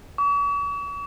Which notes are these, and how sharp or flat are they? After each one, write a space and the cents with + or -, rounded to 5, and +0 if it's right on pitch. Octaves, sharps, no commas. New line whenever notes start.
C#6 +45